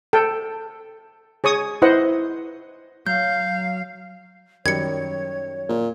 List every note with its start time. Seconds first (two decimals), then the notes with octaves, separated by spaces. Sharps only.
0.13 A4 G5
1.44 G#4 C#5 C#6 D#6
1.82 E4 B4 C5 D#5 F#5
3.07 F#3 F5 G6
4.66 F#2 D#3 G3 C#5 G#6 C#7
5.69 A#2